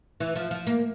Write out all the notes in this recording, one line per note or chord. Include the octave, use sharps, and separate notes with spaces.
E3
F3
F3
A#3